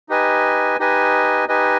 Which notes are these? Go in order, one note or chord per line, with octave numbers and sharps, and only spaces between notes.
D#4 G4 B4 D#5 G#5
D#4 G4 B4 D#5 G#5
D#4 G4 B4 D#5 G#5